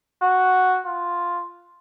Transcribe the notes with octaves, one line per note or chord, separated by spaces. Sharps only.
F#4
F4